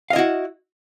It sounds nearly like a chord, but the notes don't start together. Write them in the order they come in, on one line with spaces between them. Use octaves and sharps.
F5 D#5 E4 F#4